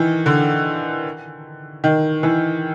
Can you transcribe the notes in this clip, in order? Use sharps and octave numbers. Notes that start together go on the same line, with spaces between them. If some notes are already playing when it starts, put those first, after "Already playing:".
Already playing: D#3 E3
D3
D#3
E3